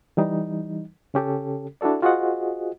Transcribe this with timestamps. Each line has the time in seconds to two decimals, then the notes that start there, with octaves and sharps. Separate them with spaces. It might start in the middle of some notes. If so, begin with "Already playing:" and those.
0.17 E3 G3 D#4
1.14 C#3 C#4 G4 A4
1.81 D4 E4 F#4 A4 D5
2.02 F4 F#4 G#4 C5 D#5 F#5